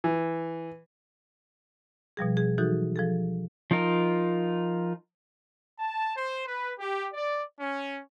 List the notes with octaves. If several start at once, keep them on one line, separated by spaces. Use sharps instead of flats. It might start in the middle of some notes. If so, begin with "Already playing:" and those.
E3
B2 F3 G3 G#4
G#4
E3 F#3 D#4 F#4 G#4 A4
F3 G#4 A4
F3 D#4 F4 A#4
A5
C5
B4
G4
D5
C#4